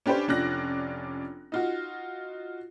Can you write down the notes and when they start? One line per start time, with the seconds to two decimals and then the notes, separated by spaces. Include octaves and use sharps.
0.06 C#4 D4 G4 B4 C5
0.28 F1 C#4 D4 F4 F#6 A#6
1.52 D#4 F4 F#4